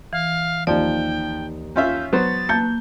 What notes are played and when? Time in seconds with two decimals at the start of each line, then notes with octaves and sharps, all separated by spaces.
0.13 E3 F5
0.67 D#2 F3 D#4 D5 G5
1.76 C#4 F4 E5 G6
2.13 F#3 B3 C5 A6
2.49 A#3 A5 G6